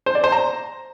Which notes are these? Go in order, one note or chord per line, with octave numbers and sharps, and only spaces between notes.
C5
D5
C5
A#5